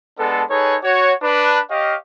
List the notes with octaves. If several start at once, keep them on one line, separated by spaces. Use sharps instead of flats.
G#3 B3 D4 A4
D#4 G#4 A4 B4 C#5
F#4 C#5
D4 B4
G4 C#5 D#5 F5